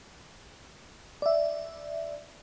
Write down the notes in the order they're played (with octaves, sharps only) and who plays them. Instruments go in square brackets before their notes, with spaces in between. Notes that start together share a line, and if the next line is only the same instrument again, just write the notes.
[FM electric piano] D5 E5